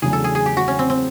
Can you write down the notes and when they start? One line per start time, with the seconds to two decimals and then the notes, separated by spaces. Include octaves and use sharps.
0.02 E2 C#3 F#3 A3 D4 G#4
0.13 A4
0.24 G#4
0.35 G#4
0.46 G4
0.57 F#4
0.68 C#4
0.79 C4
0.90 C4